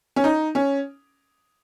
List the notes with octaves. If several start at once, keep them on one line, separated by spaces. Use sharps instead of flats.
C#4
D#4
C#4